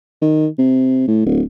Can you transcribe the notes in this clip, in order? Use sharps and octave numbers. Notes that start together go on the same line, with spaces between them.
D#3
C3
A2
D1